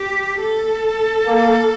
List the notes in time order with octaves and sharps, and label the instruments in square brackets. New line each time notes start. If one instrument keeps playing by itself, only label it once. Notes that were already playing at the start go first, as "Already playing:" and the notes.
Already playing: [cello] G4
A4
[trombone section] A#3